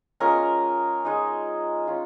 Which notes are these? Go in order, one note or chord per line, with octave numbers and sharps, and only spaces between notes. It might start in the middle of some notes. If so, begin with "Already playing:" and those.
G#3 C#4 F4 A#4
G#3 D#4
C#4 F4